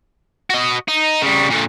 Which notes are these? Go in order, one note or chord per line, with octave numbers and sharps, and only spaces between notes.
F#4 D#5
D#4
C#3 G3
A#2 D3